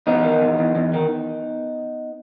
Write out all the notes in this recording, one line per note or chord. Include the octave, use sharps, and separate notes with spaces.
E2 B3 D#4
D#3
E2
E2
E2
D#3